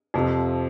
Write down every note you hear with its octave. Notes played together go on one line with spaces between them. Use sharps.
F2 C3 F3